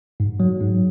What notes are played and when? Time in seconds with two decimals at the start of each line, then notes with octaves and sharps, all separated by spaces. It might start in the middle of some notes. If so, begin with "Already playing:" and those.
0.20 G#2
0.40 F#3
0.60 G#2